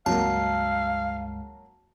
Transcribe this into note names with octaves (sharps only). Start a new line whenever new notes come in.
C#2 G2 F#3 G#3 A#3 F5 A5